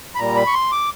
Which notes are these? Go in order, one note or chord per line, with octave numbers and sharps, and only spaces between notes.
B5
A#2 G3 A#5
B5
C#6
C6
D6